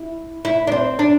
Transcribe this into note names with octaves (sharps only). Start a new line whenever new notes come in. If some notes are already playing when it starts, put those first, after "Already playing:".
Already playing: E4
E4
D4
C4
D4